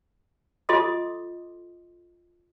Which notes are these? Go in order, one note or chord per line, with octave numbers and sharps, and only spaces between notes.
F4 A4 D#5 C6 D6 D#6